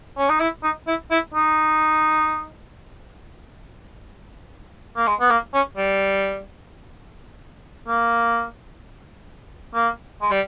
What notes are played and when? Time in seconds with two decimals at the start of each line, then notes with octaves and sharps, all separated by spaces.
0.18 C#4
0.29 D#4
0.40 E4
0.63 D#4
0.87 E4
1.11 E4
1.34 D#4
4.97 A#3
5.07 G#3
5.20 B3
5.30 A#3
5.54 C#4
5.77 G3
7.88 A#3
9.74 A#3
10.22 G#3
10.31 G3